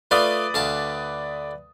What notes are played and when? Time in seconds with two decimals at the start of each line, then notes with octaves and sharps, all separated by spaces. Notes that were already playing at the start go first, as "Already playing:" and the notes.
0.11 A3 F4 B4 D5 F5 D#6
0.54 D2 F5 A5